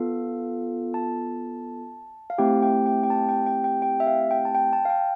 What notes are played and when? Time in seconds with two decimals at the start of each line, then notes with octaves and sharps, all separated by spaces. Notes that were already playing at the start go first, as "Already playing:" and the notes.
Already playing: B3 F4 A4 F5
0.94 A5
2.30 F5
2.38 A3 C4 E4 G4 G5
2.62 G5
2.86 G5
3.04 G5
3.10 A5
3.29 G5
3.46 G5
3.64 G5
3.82 G5
4.00 E5
4.07 F5
4.31 G5
4.45 A5
4.55 G5
4.73 A5
4.85 F5
4.90 G5